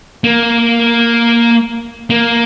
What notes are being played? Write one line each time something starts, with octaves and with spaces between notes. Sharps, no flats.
A#3
A#3